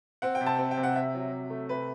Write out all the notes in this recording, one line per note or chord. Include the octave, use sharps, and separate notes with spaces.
C4 F#5
G5
C3
A5
C4
G5
C3
F#5
C3 E5
F#3
C3
A3
C3 B4